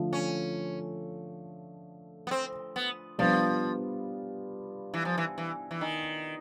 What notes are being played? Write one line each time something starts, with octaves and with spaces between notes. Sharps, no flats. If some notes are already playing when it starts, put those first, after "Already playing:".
Already playing: D3 F3 A3
C#4
B3
C4
B3
F3 G3 B3 D4 F4
E3
F3
E3
E3
E3
D#3